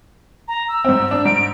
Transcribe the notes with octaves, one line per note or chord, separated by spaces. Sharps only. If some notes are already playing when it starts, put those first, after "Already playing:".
A#5
E6
G#2 C4
D4
G#2 D7